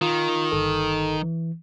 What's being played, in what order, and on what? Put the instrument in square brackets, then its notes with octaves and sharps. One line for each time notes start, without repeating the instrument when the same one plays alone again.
[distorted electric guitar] D#3 [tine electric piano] F4
[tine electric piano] G1 A4
E3